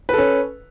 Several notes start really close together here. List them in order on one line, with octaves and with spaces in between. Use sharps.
B4 A4 C#4